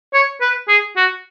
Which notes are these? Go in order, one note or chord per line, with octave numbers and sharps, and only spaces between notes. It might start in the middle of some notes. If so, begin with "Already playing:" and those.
C#5
B4
G#4
F#4